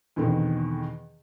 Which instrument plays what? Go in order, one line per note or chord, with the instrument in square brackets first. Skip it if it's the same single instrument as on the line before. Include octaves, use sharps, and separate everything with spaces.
[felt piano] E2 B2 D3 D#3 C4